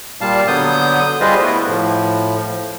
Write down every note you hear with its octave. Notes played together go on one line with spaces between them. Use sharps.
A#2 G3 F5 A5
D3 F#3 B3 D#6 G6
G3 F4 G#4 B4 C5 D#5
A3 B3 E4
A2 F3